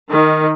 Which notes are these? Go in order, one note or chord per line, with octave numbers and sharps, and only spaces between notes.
D#3